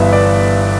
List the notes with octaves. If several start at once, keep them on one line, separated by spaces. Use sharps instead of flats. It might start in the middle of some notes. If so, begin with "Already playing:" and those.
Already playing: G1 G2 E3 B3 E5
D5